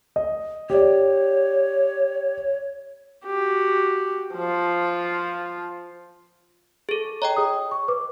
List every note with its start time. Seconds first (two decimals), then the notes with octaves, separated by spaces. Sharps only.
0.16 D#5
0.70 G4 C#5 D5
3.25 F#4 G4
4.35 F3 F4
6.89 G#4 A4
7.22 C#5 D#5 G5 A#5
7.37 G#4 D#6
7.71 C#6
7.88 B4 D6